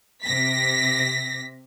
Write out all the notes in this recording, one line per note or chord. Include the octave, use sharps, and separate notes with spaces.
C3 A#6 B6